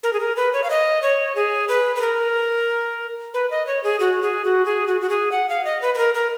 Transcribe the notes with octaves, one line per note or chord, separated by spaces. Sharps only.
A#4
G#4
A#4
B4
C#5
F5
D#5
C#5
G#4
B4
B4
A#4
B4
D#5
C#5
G#4
F#4
G#4
F#4
G#4
F#4
F#4
G#4
F#5
F5
D#5
B4
B4
A#4
A#4